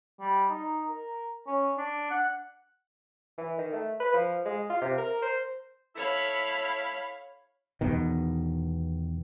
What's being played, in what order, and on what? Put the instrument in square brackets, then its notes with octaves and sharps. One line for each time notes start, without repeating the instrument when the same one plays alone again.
[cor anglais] G3
D#4
A#4
C#4
D4
F#5
[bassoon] E3
D#3
A3
B4
F3
G#3
F4
C3
A#4
C5
[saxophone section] E4 A4 [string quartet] C#5 F5 B5
[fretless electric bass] E2 B2 D#3